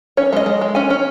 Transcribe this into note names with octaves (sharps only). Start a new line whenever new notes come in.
C#4 C#5
G#3 D#5
G#3
G#3
C#4 G#5
C#4